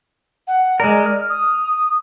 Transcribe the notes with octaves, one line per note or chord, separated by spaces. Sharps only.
F#5
G#3 A#4 D5
F6
D#6